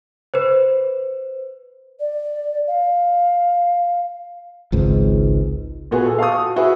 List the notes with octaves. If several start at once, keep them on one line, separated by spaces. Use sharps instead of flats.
B4 C5
D5
F5
G#1 C#2 G#2
A#2 B3 F#4 G#4
A4
F5 A5 C#6 D#6
F#4
E4 F#4 G#4 B4